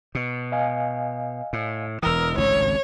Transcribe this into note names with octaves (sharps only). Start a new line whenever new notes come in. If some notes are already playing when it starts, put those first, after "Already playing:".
B2
D#5 F5 G#5
A2
E1 E3 A#4 D#6 E6
G#1 C#2 A2 C#5